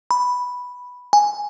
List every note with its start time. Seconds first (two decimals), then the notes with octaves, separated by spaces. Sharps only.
0.11 B5
1.13 G#5